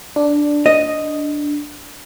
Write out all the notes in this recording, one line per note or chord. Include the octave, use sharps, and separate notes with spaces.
D4
D#5